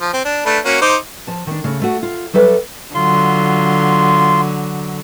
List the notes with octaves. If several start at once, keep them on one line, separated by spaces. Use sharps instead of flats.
F3
C4
D4
A3 D4 B4
A#3 C#4 F#4
D#4 C5 D6
F3 A5
D#3 D4
C#3 A3
A3 F#4
F4
F#3 G3 A4 B4 D5 E5
D3 F#3 F4 C6